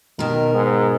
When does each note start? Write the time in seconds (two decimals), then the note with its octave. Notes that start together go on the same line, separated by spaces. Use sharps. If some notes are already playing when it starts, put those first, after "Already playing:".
0.19 B2 D#3 A#4
0.54 G#2